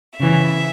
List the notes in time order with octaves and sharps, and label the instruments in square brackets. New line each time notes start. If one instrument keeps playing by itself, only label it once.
[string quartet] C#3 E3 E5